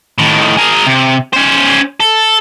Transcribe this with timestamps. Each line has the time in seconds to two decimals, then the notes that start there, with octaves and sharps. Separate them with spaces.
0.18 A2 D#3
0.57 G#4 A#4
0.87 C3
1.33 C#4 C5
2.00 A4